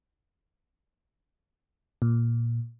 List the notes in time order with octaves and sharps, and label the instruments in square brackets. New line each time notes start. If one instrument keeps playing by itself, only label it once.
[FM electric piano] A#2